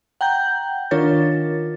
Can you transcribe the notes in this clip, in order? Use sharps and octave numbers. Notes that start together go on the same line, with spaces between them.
F#5 G5 A#5 G6
D#3 D4 F4 A#4 C#5 A6